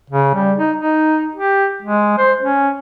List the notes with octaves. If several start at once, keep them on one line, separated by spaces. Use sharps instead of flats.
C#3
G3
D#4
D#4
G4
G#3
C5
C#4